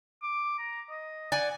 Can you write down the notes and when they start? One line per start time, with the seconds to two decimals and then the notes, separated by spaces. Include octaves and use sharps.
0.23 D6
0.59 A#5
0.90 D#5
1.32 D5 F#5 G#5